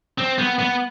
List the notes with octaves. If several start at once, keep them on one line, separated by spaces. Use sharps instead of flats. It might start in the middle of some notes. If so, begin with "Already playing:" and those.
C4
B3
B3